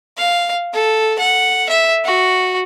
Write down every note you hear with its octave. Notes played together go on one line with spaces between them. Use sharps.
F5
A4
F#5
E5
F#4